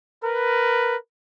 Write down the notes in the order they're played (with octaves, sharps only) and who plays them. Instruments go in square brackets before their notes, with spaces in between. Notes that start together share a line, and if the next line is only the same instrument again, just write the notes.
[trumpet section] A#4 B4